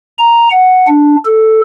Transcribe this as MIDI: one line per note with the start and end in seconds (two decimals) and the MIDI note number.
0.18 0.49 82
0.51 0.87 78
0.88 1.16 62
1.25 1.61 69